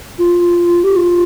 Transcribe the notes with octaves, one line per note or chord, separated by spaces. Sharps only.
F4
G4
F4